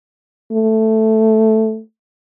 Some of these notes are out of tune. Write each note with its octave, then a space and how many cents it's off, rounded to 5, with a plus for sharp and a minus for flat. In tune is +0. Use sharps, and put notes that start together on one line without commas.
A3 +0